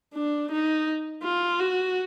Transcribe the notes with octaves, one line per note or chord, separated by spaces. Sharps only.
D4
D#4
F4
F#4